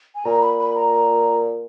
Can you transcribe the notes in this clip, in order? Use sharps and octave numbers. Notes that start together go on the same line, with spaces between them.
G#5
A#2 A#5
B5
B5
A#5